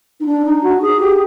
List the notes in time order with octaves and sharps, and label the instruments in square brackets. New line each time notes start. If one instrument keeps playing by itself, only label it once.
[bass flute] D#4
D4
D#4
F#4
G#4
G4